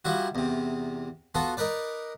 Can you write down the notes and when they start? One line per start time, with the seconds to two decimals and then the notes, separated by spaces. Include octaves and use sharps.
0.05 F3 G3 E4 F#4
0.35 E2 C3
1.35 B3 F4 F#4 A4
1.57 D#4 A#4 B4 D5